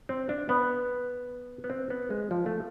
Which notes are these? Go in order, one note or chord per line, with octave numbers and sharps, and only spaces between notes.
C4
D4
B3
B3
C4
B3
G#3
F3
A3